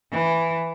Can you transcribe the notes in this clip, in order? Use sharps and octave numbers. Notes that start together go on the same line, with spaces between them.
E3